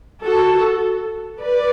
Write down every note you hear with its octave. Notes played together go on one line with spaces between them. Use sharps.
F#4 A4
B4 D5